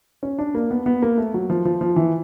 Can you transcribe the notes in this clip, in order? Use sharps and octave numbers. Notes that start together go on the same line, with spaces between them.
C#4
D4
A#3
B3
B3
A#3
A3
F#3
F3
F3
F3
E3